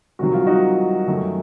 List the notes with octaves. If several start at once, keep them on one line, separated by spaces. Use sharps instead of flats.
C2 C3 D#3 F#3 F#4
F4
D#4 F#4
F#2 D#3 F#3 A3